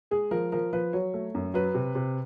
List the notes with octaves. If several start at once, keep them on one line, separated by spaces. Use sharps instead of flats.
G#3 G#4
F3 A#4
F3 A#4
F3 B4
F#3 C#5
A3
F#2
F#3 B4
C3
C3